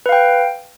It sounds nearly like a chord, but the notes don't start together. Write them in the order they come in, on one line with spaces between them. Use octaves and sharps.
B4 F5 G5